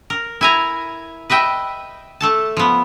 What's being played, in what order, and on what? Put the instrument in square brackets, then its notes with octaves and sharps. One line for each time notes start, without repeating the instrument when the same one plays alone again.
[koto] A#4
E4 G#5 A#5
B4 D#5 E5 G5
A3 A4 A5
F3 B3